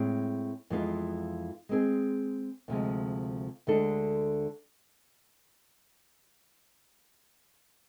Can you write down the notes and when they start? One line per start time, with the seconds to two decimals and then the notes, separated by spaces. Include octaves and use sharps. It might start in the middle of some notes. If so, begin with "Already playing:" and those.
Already playing: A2 G#3 C4 G#4
0.70 F2 E3 G#3 B3 F4
1.69 G#3 C4 G#4
2.68 D2 C3 F3 G#3
3.67 D2 D3 G#3 D4 A4